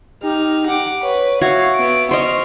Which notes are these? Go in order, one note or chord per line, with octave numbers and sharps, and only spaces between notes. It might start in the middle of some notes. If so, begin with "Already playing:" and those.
D#4 G4 F6
G4 F#5 D6
B4 C#5
F#4 C#5 E5 F5
B3 D7
C5 D#5 C#6 F6